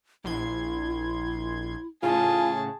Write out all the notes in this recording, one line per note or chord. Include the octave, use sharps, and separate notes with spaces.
A#1 E4 C6 G#6
A2 C#3 F4 G#4 G#5 A5